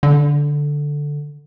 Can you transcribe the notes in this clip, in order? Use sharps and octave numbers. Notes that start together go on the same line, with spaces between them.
D3